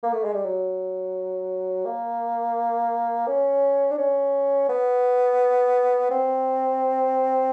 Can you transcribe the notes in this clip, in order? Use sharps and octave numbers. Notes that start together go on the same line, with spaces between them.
A#3
A3
G#3
G3
F#3
A#3
C#4
D4
C#4
B3
C4